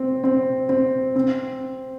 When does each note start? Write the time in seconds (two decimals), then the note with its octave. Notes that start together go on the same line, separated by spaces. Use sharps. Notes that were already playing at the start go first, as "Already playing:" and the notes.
Already playing: C4
0.24 C4
0.69 C4
1.16 C4